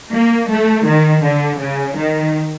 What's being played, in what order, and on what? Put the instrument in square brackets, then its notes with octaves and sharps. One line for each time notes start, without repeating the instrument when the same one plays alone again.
[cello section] A#3
A3
D#3
D3
C#3
D#3